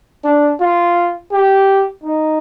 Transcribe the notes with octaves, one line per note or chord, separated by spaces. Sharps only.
D4
F4
G4
D#4